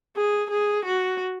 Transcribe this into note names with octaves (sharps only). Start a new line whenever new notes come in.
G#4
G#4
F#4